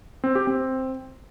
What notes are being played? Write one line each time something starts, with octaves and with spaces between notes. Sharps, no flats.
C4
G4
C4